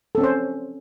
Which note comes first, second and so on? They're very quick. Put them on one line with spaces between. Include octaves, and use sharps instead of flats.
A4 C4 C#4 C5